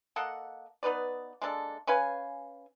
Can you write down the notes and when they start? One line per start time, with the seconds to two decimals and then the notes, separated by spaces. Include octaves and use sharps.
0.16 A#3 A4 D#5 F#5
0.83 B3 D#4 B4 D5
1.41 G#3 A#3 D4 A4
1.87 C#4 B4 F5 G#5